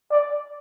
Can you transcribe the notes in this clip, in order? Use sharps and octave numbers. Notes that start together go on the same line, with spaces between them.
D5